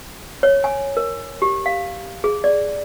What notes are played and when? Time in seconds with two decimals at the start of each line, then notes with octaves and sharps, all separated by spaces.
0.43 C#5
0.64 G#5
0.97 A#4
1.42 G4
1.66 F5
2.24 G#4
2.44 D5